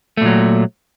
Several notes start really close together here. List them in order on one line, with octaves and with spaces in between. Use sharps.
A3 A#2 F#3